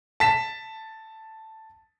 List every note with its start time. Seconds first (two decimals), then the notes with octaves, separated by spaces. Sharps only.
0.20 A5 B6 E7